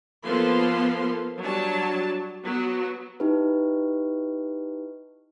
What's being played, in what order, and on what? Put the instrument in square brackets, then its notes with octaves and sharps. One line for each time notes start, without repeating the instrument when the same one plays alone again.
[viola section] F3 A#3 B3 A4 F5 C6
F#3 G3 D4 A5
F#3 B3 F#4
[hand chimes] D#4 E4 G4 B4